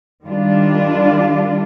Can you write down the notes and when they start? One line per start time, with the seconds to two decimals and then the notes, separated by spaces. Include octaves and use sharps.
0.25 D#3 G3 D4 F4